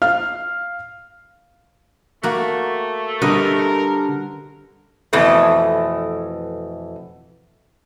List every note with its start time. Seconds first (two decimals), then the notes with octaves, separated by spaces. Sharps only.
0.02 F5 F6
2.23 A3 A#3 F#4
3.22 D3 G3 A#4 B4 D#5
5.13 F2 B2 E3 A3